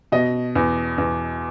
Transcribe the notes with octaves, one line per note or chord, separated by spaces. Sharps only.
B2 D#5
E2
E2